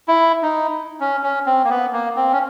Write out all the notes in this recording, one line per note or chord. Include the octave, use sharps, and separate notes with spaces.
E4
D#4
C#4
C#4
C4
A#3
B3
A#3
C4
C#4